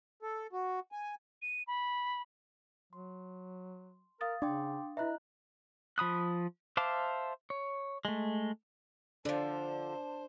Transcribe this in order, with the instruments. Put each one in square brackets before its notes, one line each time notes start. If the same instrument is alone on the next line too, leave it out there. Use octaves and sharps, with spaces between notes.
[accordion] A4
F#4
G#5
[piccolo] D#7
B5
[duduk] F#3 [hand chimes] C6
[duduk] A#4 [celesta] F5 D#6 A6
[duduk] C#3 [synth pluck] D4 [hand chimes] G5 C6 D6
[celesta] E4 E5 [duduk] B4 [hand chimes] D#5 A#5 F#6
[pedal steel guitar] F3 B5 D#6 F#6
C5 E5 F5 A5 D6
C#5
G#3 A3
[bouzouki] D3 F3 [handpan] D4 D5 [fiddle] C5 [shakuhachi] A5